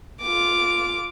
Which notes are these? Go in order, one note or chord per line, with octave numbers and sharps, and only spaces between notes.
F4 D6